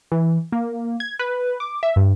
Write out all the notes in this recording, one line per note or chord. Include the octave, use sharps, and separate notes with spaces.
E3
A#3
G#6
B4
D6
E5
G2